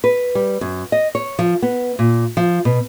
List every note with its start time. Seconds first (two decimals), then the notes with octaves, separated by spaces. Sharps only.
0.04 B4
0.35 G3
0.61 F#2
0.92 D#5
1.15 C#5
1.39 F3
1.62 B3
1.99 A#2
2.37 F3
2.65 B2